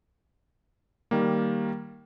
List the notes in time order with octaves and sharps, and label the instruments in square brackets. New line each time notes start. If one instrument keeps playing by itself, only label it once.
[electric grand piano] D#3 G3 A#3